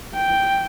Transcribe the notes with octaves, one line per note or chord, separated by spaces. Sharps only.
G5